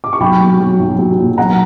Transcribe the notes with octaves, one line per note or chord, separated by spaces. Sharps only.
D6
C#6
B1 G5 B5
F#3
F#3
B1
F#3
A#2
B1 F#5 A#5